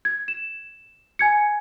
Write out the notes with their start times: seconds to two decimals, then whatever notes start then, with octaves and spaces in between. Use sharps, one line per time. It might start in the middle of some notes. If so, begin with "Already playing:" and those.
0.05 G#6
0.28 E7
1.19 G#5 G#6 C#7